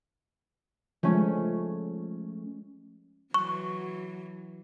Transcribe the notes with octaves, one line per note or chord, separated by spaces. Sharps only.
F3 G#3 A3 C#4
E3 F#3 C#6